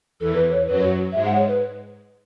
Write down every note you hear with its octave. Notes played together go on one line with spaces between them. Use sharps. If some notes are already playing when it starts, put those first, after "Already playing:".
E2 E3 A4
B4
C#5
F#2 F#3 B4
F#4
G#2 G#3 E5
F#5
C#5
B4